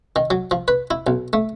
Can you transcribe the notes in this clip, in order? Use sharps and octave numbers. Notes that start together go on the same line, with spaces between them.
D#3
F#3
F3
B4
E4
B1
A3